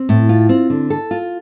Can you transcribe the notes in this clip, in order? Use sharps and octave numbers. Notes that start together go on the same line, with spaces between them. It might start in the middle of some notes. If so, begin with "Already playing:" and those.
Already playing: C4
A2
F4
C4
D3
A4
F4